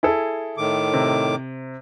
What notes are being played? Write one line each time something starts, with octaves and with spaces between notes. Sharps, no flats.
E4 G#4 A4
A2 D#3 D6
C3